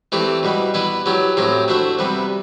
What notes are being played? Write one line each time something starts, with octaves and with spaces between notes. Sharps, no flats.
E3 A3 C4 G4 D5
B2 G3 B3
B3 E4 B4 D5
F#3 B3 E4 G4
A2 F#3 C4 G4 C5
A3 D4 F#4 C5 E5
C3 G3 B3